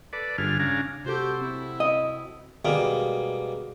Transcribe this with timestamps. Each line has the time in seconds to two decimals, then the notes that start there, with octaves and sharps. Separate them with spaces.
0.13 A4 B4 D5
0.38 G2 D3 F4 G#4 F6
0.59 C#3 D4 F5 G#5 A#5
1.04 C3 F#4 G4 A4 C5
1.41 C4 E4
1.80 D#5
2.65 B2 G3 G#3 A#3